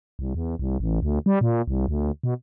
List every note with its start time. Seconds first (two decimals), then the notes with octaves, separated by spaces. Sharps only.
0.19 C2
0.35 E2
0.59 C2
0.80 A1
1.02 D2
1.26 G3
1.41 A#2
1.68 C2
1.88 D2
2.23 B2